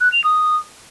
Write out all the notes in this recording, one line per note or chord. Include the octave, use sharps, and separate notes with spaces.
F#6
F7
D#6